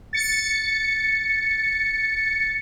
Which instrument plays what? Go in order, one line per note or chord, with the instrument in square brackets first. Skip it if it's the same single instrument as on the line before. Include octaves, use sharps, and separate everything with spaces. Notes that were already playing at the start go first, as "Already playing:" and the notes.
[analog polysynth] A6 C#7